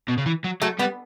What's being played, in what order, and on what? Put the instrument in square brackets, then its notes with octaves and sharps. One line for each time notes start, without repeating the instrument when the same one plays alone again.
[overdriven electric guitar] B2
C#3
E3
F#3
[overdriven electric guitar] F#3 [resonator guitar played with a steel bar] A3
[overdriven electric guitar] G3 [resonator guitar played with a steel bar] B3